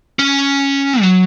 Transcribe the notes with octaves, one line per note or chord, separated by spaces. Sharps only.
C#4
F#3